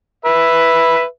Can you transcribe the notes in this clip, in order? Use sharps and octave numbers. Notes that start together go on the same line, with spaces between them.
B4 E5